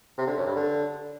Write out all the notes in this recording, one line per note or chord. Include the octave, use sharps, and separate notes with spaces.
C3
D3
F#2
G2
D3